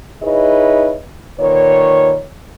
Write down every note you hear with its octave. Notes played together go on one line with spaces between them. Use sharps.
D#4 E4 G#4 B4 C#5 D#5
A#2 D#3 B4 C#5